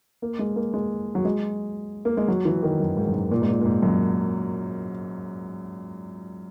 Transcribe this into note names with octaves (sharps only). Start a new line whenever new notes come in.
A#3
G#3
A#3
G#3
F#3
G#3
A#3
G#3
F#3
E3
D#3
F#2
G#2
F#2
G#2
A#2
G#2
A#2
A#2
G#2
F#2